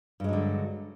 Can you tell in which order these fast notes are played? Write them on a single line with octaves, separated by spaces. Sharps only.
G2 G#3 F#3 D3